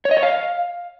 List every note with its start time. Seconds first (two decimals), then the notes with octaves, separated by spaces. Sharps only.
0.05 C#5
0.11 D#5
0.17 C#5
0.23 F5